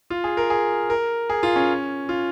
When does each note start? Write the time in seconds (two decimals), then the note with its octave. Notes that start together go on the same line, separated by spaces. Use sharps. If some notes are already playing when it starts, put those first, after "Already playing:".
0.10 F4
0.24 G#4
0.37 A#4
0.50 G#4
0.90 A#4
1.30 G#4
1.43 F4
1.56 C#4
2.09 F4